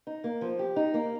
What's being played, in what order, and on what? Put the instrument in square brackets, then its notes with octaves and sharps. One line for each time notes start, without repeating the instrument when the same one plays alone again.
[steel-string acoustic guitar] D#4
A#3
F3
G4
D#4
A#3